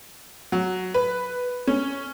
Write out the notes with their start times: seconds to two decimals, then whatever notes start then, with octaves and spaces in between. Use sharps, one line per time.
0.52 F#3
0.94 B4
1.67 C#4